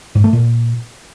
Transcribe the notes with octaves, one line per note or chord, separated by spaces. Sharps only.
G#2
A3
A#2